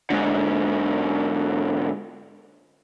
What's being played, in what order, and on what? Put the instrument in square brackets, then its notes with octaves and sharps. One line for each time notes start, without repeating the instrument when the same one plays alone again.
[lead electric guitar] G#2 D3